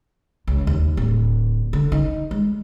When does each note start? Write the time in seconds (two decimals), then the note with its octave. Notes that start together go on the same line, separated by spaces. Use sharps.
0.47 C#2
0.67 D#2
0.97 D1
1.73 D3
1.92 D#4
2.31 G#3